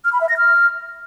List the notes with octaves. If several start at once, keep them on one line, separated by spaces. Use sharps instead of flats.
F6
B5
E5
A#6
F6